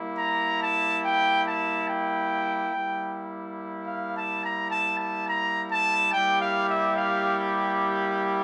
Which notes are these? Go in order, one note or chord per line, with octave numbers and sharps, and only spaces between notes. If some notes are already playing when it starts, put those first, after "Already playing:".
Already playing: G3 A#3 E4
A#5
A5
G5
A5
G5
G3 A#3 E4
F5
A5
A#5
A5
A5
A#5
A5
G3 A#3 E4 G4 G5
F5
E5
F5